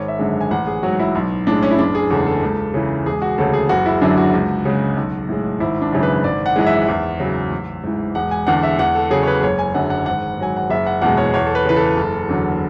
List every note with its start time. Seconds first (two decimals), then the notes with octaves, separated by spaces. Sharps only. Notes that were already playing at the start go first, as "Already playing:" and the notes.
Already playing: G#1 C#5
0.08 E5
0.19 F#2 D3 G#3
0.41 G#5
0.51 A1 F#5
0.67 G#4
0.83 G#2 F#3 F#4
0.99 E4
1.15 B1
1.47 A2 G#3 D4
1.63 C#4
1.71 E4
1.78 F#1 D4
1.95 G#4
2.10 E2 C#3 G#3 A4
2.26 A4
2.42 C#2
2.74 C#3 E3
3.06 E1 G#4
3.22 F#4
3.38 D2 C#3 A4
3.53 G#4
3.69 F#1 F#4
3.86 E4
4.02 F#2 D3 F#3 D4
4.18 F#4
4.33 C#2
4.65 C#3 G#3
4.97 B1
5.29 A2 G#3
5.60 G#1 E4
5.81 D4
5.92 F#2 C#3 E3
6.03 B4
6.24 G#1 D5
6.46 F#5
6.56 F#2 E3 G#3
6.67 E5
6.88 E2
7.20 C#3 F#3
7.51 A1
7.83 G#2 E3
8.15 E1 F#5
8.31 G#5
8.47 E2 D3 F#5
8.63 E5
8.79 E2 F#5
8.95 A4
9.10 C#3 F#3 G#4
9.23 C#5
9.27 B4
9.43 F#1 C#5
9.59 G#5
9.74 F#2 D3 F#3 F#5
9.90 F#5
10.06 G#1 F#5
10.38 G#2 F#3 G#5
10.56 F#5
10.70 F#1 E5
10.86 F#5
11.01 E2 B2 G#3 F#5
11.17 C#5
11.34 E2 C#5
11.46 A4
11.55 B4
11.65 C#3 E3 B4
11.76 A4
11.97 F#1
12.29 E2 D3 F#3